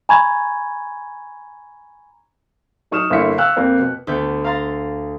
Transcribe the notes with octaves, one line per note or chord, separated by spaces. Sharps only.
G#5 A#5 B5 C#6 G#6
F#3 D#4 C#6 D#6 F6 E7
G1 D3 A#3 E4 B6 C#7
F5 G5 C#6 E6 F#6
F2 A#3 C4
B2
D2 B3 G6
F5 A#5 C6 A6